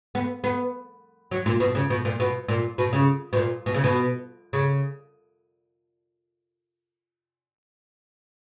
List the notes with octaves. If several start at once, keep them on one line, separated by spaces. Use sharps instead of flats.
B3
B3
F#3
A#2
B2
C#3
B2
A#2
B2
A#2
B2
C#3
B2
A#2
B2
C#3
B2
C#3